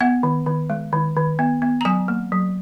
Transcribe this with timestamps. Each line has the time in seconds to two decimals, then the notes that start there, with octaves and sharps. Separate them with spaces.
0.01 B3 F#5
0.23 D#3
0.46 D#3
0.70 G#3
0.93 D#3
1.16 D#3
1.39 B3
1.62 B3
1.81 A#5
1.85 F#3 G#5
2.08 A#3
2.32 F#3